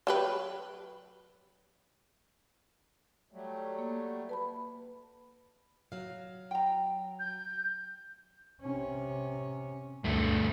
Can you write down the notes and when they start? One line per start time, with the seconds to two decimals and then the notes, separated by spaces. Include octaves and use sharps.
0.07 F#3 G4 B4
3.32 F#3 G3 A3
3.79 A#3
4.29 B4 A5 B5
5.92 F#3 F5
6.51 G5 A#5
7.19 G6
8.61 C3 C#4
10.04 D2 G2 A3